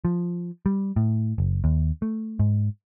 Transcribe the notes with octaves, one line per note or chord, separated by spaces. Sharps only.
F3
G3
A2
F#1
D#2
A3
G#2